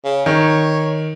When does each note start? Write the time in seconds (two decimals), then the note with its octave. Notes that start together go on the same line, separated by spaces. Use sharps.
0.04 C#3
0.26 D#3 C#5